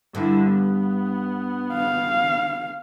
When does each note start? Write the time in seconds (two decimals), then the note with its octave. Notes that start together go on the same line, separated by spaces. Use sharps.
0.15 G2 D3 E4
0.50 B3
1.73 F5